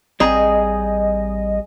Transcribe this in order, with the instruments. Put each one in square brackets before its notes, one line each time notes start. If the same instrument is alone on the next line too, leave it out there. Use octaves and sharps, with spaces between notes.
[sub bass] A1 [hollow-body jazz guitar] G3 C4 A#5 [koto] G#4 [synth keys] D#5